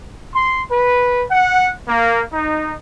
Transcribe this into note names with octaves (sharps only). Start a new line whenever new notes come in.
C6
B4
F#5
A#3
D#4